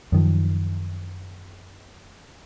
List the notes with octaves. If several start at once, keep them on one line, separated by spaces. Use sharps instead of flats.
F#2 D#3 F3